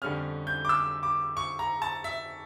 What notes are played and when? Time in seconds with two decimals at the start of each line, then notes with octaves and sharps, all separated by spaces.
0.02 F2 D3 G3 C#4 F6
0.47 G6
0.65 D6
0.69 E6
1.03 D6
1.37 C#6
1.59 A#5
1.82 A5
2.04 E5